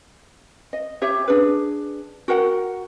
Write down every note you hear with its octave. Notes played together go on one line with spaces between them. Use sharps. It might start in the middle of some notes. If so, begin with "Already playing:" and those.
D#5
G4 C#5 E5
D4 G#4 B4
F#4 A#4 F#5 G5